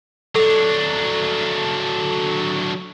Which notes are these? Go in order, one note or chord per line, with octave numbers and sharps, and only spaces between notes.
F#3 D4 A4